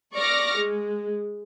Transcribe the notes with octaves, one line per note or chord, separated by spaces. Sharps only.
D5 C#6 D6 F6 A#6
G#3